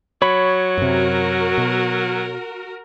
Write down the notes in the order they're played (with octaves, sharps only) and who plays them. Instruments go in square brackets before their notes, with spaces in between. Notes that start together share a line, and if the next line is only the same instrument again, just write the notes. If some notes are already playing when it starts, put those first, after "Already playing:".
[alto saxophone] F#3 [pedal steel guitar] C#5 B5
[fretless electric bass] F#2 C3 [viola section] F#4 A#4
[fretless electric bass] B2